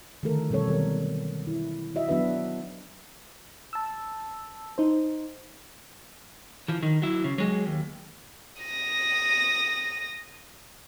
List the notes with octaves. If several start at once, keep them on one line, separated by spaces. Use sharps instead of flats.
D3 D#3 F3 A3 A4 A#4
B2 G3 C4 A4 C#5
D#3 F#3 A4 A#4
E4
E4 F#4 D#5 E5
F#3 B3 D4 F#4 B4 E5
A5 E6
D#4 C5
E3 F3
D#3
F#3 E4
C#3
F#3 G#3
D#2
D#6 A#6